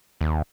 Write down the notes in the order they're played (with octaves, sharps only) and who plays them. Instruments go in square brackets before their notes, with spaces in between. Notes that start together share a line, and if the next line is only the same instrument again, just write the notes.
[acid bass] D#2